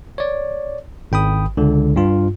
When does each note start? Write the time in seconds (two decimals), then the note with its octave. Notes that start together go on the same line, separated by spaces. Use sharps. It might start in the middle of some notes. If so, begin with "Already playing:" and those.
0.18 C#5 D5
1.12 G#1 G5 B5 D#6
1.57 C#2 D3
1.96 G2 F4